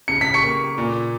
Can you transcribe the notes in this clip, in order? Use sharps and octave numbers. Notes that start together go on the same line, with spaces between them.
C#3 C#7
B6
C#6 C#7
A#3
A#2